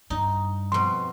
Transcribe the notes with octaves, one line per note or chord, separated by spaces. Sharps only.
G2 D4 D#4
F2 B2 C6